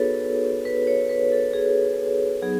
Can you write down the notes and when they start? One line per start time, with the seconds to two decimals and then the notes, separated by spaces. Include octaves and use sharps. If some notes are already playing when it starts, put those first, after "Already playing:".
Already playing: B3 D#4 F#4 G#4 A4 B4 C#5
0.65 B4
0.87 C#5
1.09 B4
1.32 A4
1.53 G#4
2.42 F#3 B3 D#4 G#4